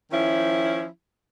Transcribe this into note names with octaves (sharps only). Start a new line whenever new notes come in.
D#3 F3 C#4 E4